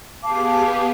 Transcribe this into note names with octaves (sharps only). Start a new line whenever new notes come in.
B3 G4 G#4 F5 A5 D6